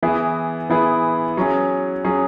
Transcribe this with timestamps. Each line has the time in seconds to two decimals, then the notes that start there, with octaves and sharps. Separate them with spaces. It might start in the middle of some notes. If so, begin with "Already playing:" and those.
0.03 E3 B3 E4 G#4
0.69 E3 B3 E4 G#4
1.37 F#3 C#4 G#4
2.04 F#3 C#4 G#4